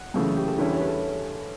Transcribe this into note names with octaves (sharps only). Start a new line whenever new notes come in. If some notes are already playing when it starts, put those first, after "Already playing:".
Already playing: F#5
F#2 C#3 E3 A3
G4
A4
E2 D3 G3 C#4 E4 B4
C#5
B4
A4